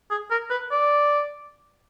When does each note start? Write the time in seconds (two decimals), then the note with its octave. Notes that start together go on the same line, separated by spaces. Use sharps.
0.10 G#4
0.31 A#4
0.50 B4
0.72 D5